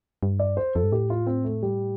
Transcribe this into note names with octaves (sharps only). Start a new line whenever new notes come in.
G2
D5
C5
F2 A4
G2
A2 G4
F4
C4
A3
G3